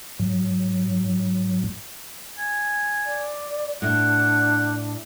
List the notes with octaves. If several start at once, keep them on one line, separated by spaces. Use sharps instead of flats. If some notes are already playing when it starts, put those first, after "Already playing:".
G#2 F#3
G#5
D5
A2 D4 F#5